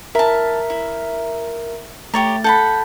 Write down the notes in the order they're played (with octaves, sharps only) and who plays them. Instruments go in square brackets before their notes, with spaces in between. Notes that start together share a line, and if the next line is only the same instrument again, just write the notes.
[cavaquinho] E4 A5 [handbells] A#4 E5 A#5
[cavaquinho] E4
[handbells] A3 A6 [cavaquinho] G4 C#5 A#5
[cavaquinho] A4 F#5 B5 [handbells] G6